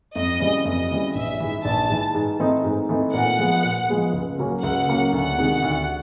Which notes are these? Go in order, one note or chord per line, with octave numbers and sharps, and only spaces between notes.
F2 D#5
C#3 E3 G3
F2 D#5
C#3 E3 G3
A#1 E5
G#2 E3
A#1 A5
G#2 E3
G#2
E3 A3 C4 D#4
G#2
E3 A3 C4 D#4
A#2 F#5
F3 G#3 B3
A#2
F3 G#3 B3
C#2
C#3 F#3 A#3 C#4
C#2 F#5
C#3 F#3 A#3 C#4
D2 F#5
C3 D#3 G#3
D2